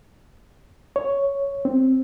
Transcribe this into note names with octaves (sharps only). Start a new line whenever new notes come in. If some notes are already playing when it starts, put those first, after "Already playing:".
C#5
C4